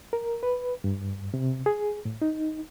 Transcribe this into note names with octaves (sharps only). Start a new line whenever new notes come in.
A#4
B4
G2
C3
G#4
A2
D#4